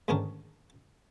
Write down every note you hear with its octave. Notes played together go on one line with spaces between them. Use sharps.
D2 G#2 D#3 C#4 D4 A#4